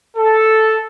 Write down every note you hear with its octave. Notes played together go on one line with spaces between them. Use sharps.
A4